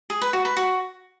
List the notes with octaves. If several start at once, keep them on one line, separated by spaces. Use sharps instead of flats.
G#4
B4
F#4
B4
F#4